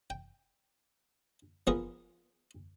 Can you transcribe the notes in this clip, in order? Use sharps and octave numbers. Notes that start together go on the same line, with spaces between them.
G5
F3 B3 G#4 A#4 B4